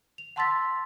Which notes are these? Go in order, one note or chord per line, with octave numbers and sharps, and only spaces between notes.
F7
F#5 A5 C6 E6 A6 B6